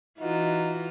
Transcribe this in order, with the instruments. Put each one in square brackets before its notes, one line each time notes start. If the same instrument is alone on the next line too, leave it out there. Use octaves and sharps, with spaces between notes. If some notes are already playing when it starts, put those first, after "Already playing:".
[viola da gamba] E3 F4 F#4 [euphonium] D#4